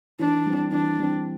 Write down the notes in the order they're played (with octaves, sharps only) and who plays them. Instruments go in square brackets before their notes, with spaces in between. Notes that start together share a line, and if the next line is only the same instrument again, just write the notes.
[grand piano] E3 [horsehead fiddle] D4
[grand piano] G3 C4
[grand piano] E3 [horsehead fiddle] D4
[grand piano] G3 C4